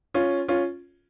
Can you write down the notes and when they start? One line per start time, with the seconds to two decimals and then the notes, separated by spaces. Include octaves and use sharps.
0.14 C#4 F4
0.48 C#4 F4